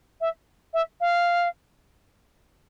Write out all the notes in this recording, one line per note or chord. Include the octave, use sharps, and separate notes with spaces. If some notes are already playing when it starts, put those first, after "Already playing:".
E5
E5
F5